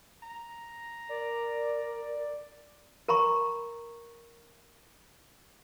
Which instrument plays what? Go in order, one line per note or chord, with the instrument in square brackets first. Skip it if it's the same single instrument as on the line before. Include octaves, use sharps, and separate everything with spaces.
[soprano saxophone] A#5
[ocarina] A#4 [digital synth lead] D5
[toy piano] A#4 A#5 B5 C#6